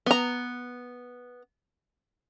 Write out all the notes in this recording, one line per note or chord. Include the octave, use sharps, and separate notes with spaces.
B3 A#5